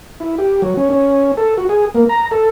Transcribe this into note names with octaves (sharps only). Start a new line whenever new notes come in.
E4
G4
F#3
C#4
C#4
A4
F#4
G#4
A#3
A#5
A4